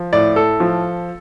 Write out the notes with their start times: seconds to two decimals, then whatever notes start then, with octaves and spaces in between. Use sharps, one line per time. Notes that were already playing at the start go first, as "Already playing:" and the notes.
Already playing: F3
0.13 A2 D5
0.36 A4
0.60 F3